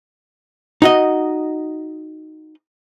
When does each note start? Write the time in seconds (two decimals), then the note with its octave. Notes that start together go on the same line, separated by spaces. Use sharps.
0.82 D#4 F#4 D#5